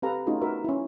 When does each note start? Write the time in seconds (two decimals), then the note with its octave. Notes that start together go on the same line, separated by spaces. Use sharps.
0.02 C4 G4 A4 B4 F5 A#5
0.26 A3 C#4 D#4 F4 F#4 G#4
0.41 B3 F#4 A#4 B4 E5 B5
0.64 C#4 E4